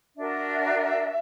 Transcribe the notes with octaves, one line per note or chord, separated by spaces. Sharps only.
D4 F#4 A#4 E5